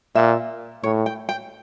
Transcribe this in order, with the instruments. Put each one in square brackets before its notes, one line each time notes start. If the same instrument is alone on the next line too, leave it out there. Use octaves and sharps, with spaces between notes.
[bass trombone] A#2 [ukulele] E5
[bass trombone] A2 [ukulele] C#5
[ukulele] G5
G5